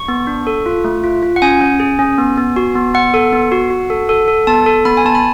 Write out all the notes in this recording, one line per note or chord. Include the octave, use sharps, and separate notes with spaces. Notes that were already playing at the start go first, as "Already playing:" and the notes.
Already playing: C#6
B3
D4
A4
F4
A3
F4
F4
F#5
C#4 G#5
C#4
G#4
C#4
B3
B3
F#4
B3
B3 F#5
A4
B3
F#4
F#4
A4
A4
A4
B3 A5
A4
B3 B5
G#5
B3 A5
B5